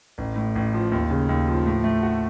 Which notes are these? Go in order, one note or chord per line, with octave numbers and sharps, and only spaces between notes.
A1
A2
A1
F3
D#2
C#3
D#2
F3
A2
A3
F#4